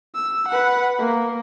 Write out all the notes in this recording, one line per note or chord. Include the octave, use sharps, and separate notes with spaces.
E6
B4 F#5
A#3